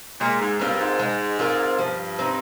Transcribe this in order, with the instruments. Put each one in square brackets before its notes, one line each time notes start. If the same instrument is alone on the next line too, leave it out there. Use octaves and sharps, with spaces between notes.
[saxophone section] A#2 [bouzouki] G#3
[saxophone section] G#2
[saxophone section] G2 [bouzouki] C4 F4 A#4
[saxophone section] G#2
[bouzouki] G#3
C4 F4 A#4
[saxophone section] G2 [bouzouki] F3
[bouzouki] C4 D#4